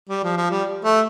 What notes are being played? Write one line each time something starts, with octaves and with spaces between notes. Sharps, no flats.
G3
F3
F3
G3
A3